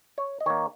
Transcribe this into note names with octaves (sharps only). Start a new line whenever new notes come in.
C#5
D#5
D#3 A#3 C#5